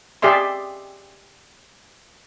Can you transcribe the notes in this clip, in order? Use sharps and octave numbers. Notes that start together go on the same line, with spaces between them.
G4 G#4 D5 E5 C6